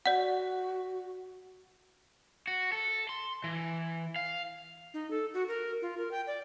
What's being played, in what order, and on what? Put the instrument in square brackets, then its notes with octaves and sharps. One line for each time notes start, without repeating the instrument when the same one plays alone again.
[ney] F#4 [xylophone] D5 F#5
[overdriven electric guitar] F#4
A4
C6
E3
F5
[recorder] D#4
A4
F#4
A#4
F4
A#4
G5
D5